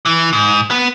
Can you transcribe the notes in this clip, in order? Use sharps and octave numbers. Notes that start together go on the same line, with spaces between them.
E3
G#2
B3